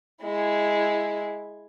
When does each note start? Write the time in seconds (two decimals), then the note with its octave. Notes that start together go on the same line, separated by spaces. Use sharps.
0.22 G#3 E4